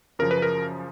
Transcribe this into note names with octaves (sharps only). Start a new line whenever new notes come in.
F#2 C#3 F3 A#4
B4
A#4